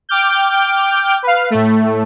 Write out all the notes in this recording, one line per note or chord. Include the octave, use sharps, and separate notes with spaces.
G5 D6 F6 G6
B4 F5
A2 A3